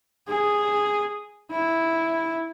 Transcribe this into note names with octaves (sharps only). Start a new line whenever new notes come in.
G#4
E4